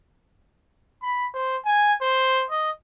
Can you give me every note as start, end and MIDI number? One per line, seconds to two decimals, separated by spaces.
1.03 1.27 83
1.34 1.57 72
1.66 1.94 80
2.02 2.44 72
2.51 2.71 75